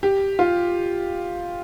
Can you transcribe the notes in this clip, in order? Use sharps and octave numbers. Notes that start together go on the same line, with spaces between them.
G4
F4